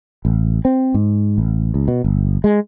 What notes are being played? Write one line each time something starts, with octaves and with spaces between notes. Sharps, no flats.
A1
C4
G#2
A1
C#2
B2
G1
G#3